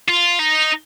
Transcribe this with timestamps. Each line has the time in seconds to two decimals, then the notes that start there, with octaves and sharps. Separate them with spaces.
0.09 F4
0.39 D#4